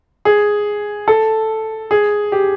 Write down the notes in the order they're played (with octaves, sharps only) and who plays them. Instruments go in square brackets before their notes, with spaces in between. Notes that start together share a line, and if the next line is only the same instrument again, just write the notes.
[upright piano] G#4
A4
G#4
G4